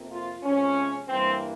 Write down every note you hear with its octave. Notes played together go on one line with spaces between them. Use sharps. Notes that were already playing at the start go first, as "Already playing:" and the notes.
Already playing: F2 C3 F3 A#3
F4
C3 F3 G#3 C#4
G2 E3 G3 A#3 C4